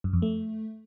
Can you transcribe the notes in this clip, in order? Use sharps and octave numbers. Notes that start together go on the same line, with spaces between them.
F#2
F2
A3